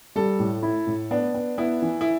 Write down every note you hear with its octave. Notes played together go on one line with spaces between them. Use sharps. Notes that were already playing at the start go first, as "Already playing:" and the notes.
G3 A4
A2
E4
A2
B3 D4
B3
B3 E4
E3
E4